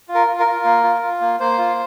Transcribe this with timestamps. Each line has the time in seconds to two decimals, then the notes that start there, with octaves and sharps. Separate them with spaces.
0.09 F4
0.15 A#4
0.27 F4
0.39 A#4
0.46 F4
0.64 A#3
0.83 F4
1.02 F4
1.21 A#3
1.40 A#3 C5
1.58 F4